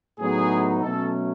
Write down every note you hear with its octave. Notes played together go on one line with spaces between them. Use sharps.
A2 F#3 B3 D#4 G#4
B2 F#3 A3 C#4 A4